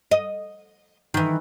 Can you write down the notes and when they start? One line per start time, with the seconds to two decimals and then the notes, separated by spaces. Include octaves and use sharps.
0.11 D#5
1.14 D#3 E3